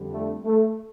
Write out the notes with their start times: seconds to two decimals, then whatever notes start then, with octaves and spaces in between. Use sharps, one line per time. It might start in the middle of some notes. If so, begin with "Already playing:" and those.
Already playing: F2 D3 G3
0.13 A3
0.45 A3